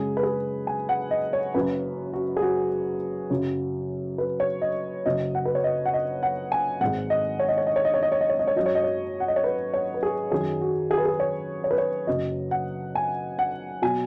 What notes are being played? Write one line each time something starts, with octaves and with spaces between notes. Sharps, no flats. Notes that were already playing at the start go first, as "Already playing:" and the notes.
Already playing: F#2 C#3 G#3 G#4
B4
G#4
G#5
F#5
D#5
C#5
F#1 F#2 C#3 F#3 B4
F#4
G#4
F#4
F#2 C#3 F#3
B4
C#5
D#5
F#1 F#2 F#3 D#5
F#5
B4
C#5
D#5
F#5
D#5
F#5
G#5
G#1 G#2 G#3 F#5
D#5
C#5
D#5
C#5
D#5
C#5
D#5
C#5
D#5
C#5
D#5
C#5
D#5
C#5
F#2 F#3 D#5
C#5
D#5
C#5
F#5
D#5
C#5
B4
C#5
B4
G#4
F#2 D#3 F#3 G#4
F#4
G#4
B4
G#4
C#5
C#5
B4
C#5
F#1 F#2 F#3 D#5
F#5
G#5
F#5
B2 F#3 G#5